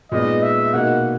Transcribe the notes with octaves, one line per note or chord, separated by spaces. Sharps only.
A#2 G#3 B3 D#4 D#5
E5
B2 A#3 D#4 F#5